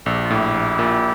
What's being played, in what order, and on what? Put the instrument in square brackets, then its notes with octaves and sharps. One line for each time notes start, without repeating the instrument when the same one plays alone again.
[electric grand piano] A#1 [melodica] A4
[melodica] G4
F4
[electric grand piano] A2 [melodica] E4 G4
[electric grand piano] A#1
A#2